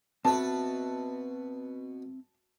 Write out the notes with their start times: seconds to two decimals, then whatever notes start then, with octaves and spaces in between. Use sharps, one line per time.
0.25 B2 C4 B4 E5 A5